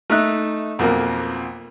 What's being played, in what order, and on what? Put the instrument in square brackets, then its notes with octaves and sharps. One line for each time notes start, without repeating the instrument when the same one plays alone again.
[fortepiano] A3 D#4 E5 F#6
B1 F2 A#3